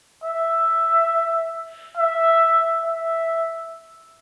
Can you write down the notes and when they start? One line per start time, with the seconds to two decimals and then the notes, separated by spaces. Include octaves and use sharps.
0.24 E5
1.97 E5
2.84 E5